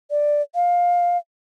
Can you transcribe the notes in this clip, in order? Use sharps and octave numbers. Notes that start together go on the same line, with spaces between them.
D5
F5